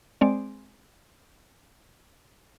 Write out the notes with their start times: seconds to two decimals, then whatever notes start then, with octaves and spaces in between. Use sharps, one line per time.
0.21 G#3 C4 D5